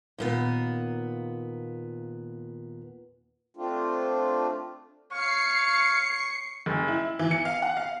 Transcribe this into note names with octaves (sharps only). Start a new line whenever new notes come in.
D#2 A#2 B3
A3 C4 D4 F4
C#5 F5 C#6 C7 C#7
F#1
E4
E3
C#7
F5
F#5
F5